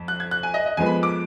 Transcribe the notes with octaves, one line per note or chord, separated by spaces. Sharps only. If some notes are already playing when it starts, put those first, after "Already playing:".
Already playing: F2
F#6
G#6
F#6
G#5
D#5
D#5
F2 F3 G#3 B3 G#5
B5
D6